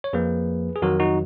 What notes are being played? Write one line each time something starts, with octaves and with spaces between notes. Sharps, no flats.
C#5
F2 F3 A#3 G#4 B4
G#4
F2 D#3 F#3 F#4 A#4
D#4 F#4